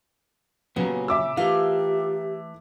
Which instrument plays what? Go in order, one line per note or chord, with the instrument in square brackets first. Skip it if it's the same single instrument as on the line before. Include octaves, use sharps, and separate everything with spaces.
[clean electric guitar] A#2 C#3 C#4 [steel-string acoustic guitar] F#3 A#3 G4 [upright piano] B3
[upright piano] E5 D6 E6
[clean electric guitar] E3 A3 [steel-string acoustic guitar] F4 A#4 F5 [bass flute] G4